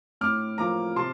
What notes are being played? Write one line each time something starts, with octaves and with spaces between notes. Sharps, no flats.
A2 D6 F6
F3 A#3 A#5 D6
C3 A5 C6